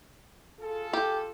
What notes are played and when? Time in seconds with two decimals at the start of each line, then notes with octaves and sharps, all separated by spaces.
0.59 F4 G#4 A4
0.93 G4